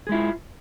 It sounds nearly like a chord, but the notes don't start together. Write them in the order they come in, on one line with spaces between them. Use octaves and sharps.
G#4 G#3 E4 F4